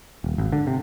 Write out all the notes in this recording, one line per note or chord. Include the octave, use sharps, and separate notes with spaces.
D#1
G#1
D3
C3